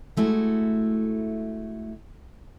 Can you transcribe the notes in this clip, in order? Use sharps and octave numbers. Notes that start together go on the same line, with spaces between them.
G#3 A3 E4 F#4